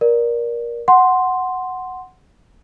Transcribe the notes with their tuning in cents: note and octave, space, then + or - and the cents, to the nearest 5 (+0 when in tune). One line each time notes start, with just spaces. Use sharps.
A#4 +20 D5 +5
F#5 +0 C6 +0